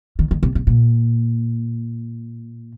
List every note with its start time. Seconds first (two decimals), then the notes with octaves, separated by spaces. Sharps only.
0.19 D#3
0.31 D#3
0.43 C3
0.55 C3
0.67 A#2